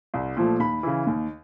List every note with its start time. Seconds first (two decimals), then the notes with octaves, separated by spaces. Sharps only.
0.14 C2
0.37 A#2 F3 A3
0.60 D#2 B5
0.83 C#3 E3
1.07 D#2